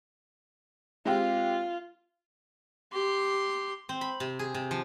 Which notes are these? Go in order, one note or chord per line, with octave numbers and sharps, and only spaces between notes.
G#3 C4 F4 G4
G4 C6
C4
B5
C3
G#4
C3
F3